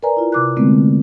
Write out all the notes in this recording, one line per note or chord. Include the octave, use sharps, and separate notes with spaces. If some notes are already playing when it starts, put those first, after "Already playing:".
A#4 B4 D5 G#5 A#5
E4 F4
C3 D6 F#6
D3 G#3 A3 B3 C4